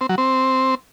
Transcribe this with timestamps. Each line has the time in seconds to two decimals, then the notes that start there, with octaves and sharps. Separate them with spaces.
0.01 C4
0.09 F#3
0.18 C4